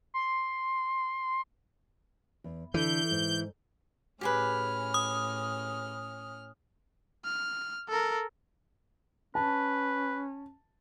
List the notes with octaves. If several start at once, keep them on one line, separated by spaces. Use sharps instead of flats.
C6
E2
D3 E3 G6
G#2
A2 C#4 G4 G#4 B4 F6
D#6
F6
A4 A#4
C#4 B4 A5